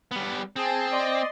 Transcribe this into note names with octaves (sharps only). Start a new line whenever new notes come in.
G3 B3
C4 G#4 A5
D5 D#5 C6